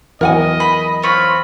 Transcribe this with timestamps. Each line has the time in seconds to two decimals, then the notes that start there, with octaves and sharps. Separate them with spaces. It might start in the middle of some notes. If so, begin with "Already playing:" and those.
0.21 E2 E3 F#3 A#4 D#5 F#5 G#5
0.60 B5
1.03 C4 F4 C#5 B5